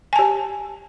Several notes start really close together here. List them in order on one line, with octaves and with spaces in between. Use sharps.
G#5 A5 G4